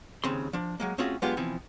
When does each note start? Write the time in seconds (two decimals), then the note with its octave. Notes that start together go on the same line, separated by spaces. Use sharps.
0.24 D#2 C#3 C4 C6
0.53 F3 D4
0.80 F#3 G#3 A#3
0.98 A3 C4 C#4 F4 F#4 G#4
1.22 F#3 G#3 B3 D4 F4 G4
1.37 B2 E3 F3 C4